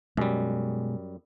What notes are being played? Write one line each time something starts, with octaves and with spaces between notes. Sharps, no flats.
F#2 B2 G3 G#3